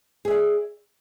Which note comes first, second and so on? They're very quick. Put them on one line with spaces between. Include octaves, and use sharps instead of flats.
G#4 E5 D5